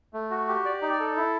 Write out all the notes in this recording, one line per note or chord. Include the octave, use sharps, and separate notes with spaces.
A3
F#4
G4
D5
D#4
A4
E4